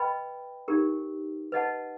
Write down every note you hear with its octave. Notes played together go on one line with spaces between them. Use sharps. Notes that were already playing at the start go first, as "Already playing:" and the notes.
Already playing: B4 D#5 G5 B5
D#4 G4 A#4
B4 D#5 F#5 A5